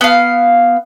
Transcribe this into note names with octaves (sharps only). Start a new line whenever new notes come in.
B3 F5